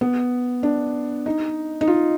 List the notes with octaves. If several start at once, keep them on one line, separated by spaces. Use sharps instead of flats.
B3
D4
D#4
D#4
F4